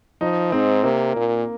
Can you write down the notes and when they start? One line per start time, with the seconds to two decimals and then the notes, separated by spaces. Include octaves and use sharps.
0.21 F3 D#4
0.52 G#2 C4
0.84 C3 A#3
1.16 A#2